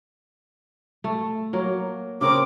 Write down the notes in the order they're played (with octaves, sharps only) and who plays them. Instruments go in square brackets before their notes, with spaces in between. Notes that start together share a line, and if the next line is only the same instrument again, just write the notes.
[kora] A3
F#3 A#3
[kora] C#3 C4 A#4 [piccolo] D6